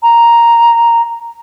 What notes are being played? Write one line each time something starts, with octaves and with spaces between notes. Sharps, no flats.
A#5